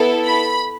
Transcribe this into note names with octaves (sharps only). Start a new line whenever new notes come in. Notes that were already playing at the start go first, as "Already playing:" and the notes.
Already playing: B3 E4 A4
B5